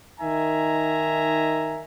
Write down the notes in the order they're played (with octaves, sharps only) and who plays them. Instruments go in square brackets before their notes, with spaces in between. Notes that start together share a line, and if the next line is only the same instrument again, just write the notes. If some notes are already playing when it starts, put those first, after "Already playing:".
[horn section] D#3 D#4 E5 G#5 A#5